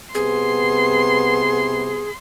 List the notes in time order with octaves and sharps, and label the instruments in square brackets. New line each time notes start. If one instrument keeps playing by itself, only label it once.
[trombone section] C2 C3 B3 [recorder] G#4 [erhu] C6